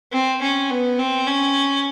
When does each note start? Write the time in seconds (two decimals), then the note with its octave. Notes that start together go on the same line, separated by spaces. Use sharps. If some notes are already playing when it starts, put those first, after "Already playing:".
0.12 C4
0.42 C#4
0.70 B3
0.99 C4
1.27 C#4